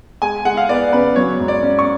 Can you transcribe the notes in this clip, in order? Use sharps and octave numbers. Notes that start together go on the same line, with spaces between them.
G#3 G#5
G#3 F#5
F5
B3 D5
C#3 B4
F#3 C#5
G#2
D5
C#4
C#6